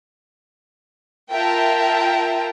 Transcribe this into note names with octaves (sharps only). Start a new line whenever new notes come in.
F4 A#4 E5 G5 A5